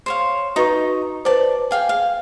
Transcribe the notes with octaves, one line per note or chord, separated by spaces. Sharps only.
C5 C#5 F5
D#4 F#4 B4 A#5 C#6 D#6
B4 C5 D5 A5
G#4 F5 G5
F5